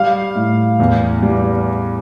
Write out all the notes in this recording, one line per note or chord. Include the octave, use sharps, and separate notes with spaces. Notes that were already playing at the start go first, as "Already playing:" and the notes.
Already playing: G3 F5
A2
E2
G3